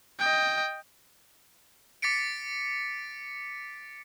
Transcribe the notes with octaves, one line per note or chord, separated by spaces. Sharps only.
D#5 G5
D6 A6 B6 C#7 D7